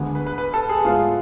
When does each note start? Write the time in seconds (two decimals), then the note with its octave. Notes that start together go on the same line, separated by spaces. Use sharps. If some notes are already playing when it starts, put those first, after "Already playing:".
Already playing: D2 D3 G#3 B3
0.15 B4
0.27 B4
0.38 B4
0.54 A4
0.69 G#4
0.84 A2 G#3 B3 F4